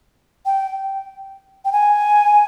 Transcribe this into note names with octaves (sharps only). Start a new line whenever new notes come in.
G5
G5
G#5